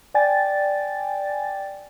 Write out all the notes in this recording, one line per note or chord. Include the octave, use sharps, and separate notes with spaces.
D5 G5 G#5 A6